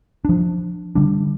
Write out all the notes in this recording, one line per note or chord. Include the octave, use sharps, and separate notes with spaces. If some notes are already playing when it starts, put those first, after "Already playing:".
F3 D4
D3 G3 D4